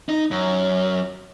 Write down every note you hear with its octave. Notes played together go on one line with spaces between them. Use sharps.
D#4
F#2